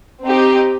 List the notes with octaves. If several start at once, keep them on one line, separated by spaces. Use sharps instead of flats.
C4 D#4 G4